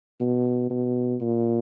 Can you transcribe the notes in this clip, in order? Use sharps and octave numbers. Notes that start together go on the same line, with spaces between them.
B2
B2
A#2